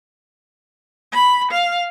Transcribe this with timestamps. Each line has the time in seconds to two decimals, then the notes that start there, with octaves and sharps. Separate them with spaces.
1.12 B5
1.51 F5